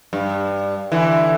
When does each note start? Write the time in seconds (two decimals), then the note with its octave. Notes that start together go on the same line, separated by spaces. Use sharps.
0.13 G2
0.92 D3 E3